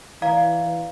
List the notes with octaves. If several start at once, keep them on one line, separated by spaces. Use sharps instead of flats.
E3 D5 F5 A#5